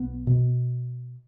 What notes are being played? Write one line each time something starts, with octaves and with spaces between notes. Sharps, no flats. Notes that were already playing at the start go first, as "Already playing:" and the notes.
Already playing: B1 B3
B2